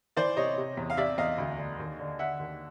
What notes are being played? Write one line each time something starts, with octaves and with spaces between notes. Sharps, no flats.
E3 C5 D5
C3 C#5 D#5
C3
E2
F5
C3 D5 E5
E2 D#5 F5
D2
D3
D#2
D3
D3 E5 F#5
D#2